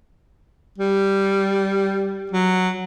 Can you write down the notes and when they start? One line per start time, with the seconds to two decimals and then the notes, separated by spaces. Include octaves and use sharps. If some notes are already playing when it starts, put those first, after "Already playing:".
0.78 G3
2.32 F#3